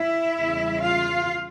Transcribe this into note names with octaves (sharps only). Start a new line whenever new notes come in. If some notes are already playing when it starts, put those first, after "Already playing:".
Already playing: E4 E5
E2 C#3 G3
F4 F5